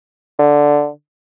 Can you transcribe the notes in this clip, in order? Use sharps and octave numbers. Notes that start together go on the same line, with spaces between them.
D3